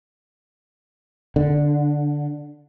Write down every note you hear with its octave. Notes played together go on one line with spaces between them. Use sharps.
D3